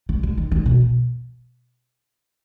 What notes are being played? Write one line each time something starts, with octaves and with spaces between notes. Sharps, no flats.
D3
D3
D#3
D#3
B2